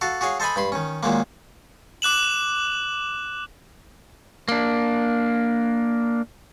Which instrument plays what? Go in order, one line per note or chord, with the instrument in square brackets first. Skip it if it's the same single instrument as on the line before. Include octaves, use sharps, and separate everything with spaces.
[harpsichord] F#4 A4 F5
F#4 G#4 C#5 F5
A4 C5 D#5 G#5 B5
G2 B5 C6
D#3 C#4
A#2 D#3 F#3 G#3 A#3
[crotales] D6 F#6 E7 F#7
[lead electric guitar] A#3 D4